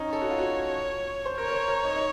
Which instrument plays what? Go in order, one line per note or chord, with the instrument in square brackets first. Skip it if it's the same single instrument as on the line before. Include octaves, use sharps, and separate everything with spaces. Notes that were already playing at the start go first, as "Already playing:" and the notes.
Already playing: [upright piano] C#4 D#4
[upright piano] A4 [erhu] C#5
[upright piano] F#4
F4
F#4
C5
[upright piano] A#4 [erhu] C#5
[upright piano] A#4
C5
A#4
D#4
D#4